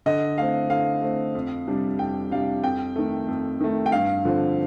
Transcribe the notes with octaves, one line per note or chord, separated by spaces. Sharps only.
D3 D#5
A3 C4 F5
D3 F5
A3 C4
F2
C3 G3 D4
F2 G5
C3 G3 D4 F5
F2 G5
D#3 A3
F2
D#3 A3
G5
G2 F5
D3 F3 C4